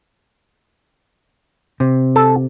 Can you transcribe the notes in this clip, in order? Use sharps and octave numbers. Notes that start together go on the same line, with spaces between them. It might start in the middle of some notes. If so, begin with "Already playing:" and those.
C3
A4